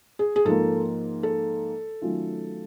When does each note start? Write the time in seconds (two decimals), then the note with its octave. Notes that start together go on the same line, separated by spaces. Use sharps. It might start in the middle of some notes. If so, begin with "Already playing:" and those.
0.19 G#4
0.36 G#4
0.45 G#2 F3 A#3 A4
1.23 A4
2.02 D#3 F#3 A3 C#4 F4